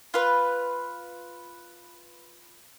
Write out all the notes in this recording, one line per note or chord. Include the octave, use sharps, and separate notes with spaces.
F4 B4